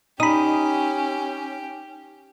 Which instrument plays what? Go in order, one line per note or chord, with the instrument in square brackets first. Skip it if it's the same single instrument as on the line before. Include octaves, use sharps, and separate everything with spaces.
[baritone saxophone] C#4 [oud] D#4 [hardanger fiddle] G4 [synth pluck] B5 D#6